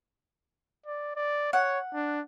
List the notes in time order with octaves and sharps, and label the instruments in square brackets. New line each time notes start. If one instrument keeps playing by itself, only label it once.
[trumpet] D5
D5
[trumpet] C#5 [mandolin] F#5
[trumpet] D4